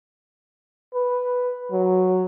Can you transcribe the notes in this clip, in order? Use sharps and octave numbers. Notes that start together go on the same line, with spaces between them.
B4
F#3